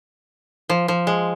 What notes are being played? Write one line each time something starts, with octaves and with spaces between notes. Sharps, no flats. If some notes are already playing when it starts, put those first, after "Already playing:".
F3
F3
G#3